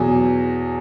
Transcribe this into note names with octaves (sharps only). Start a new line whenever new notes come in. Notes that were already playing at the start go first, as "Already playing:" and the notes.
Already playing: E2 B2 F#3 G#4